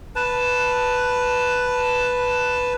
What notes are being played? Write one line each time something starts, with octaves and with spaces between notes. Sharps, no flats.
B4 A5